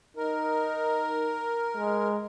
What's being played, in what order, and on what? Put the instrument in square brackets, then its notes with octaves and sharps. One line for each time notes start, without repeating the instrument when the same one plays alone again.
[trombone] D#4 [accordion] A#4
[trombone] G#3